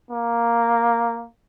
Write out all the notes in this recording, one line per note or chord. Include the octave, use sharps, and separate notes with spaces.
A#3